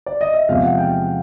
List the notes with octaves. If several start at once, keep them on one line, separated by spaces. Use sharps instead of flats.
D5
D#5
E5
E2 C3 F3 G#3 F5
F#5
G5